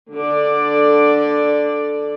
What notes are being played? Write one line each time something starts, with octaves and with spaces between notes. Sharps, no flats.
D3 A4 D5